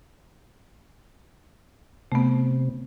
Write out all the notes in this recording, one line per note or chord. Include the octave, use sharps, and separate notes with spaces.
C3 A3 B3